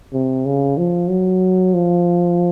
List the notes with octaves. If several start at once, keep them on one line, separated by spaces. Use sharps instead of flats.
C3
C#3
F3
F#3
F3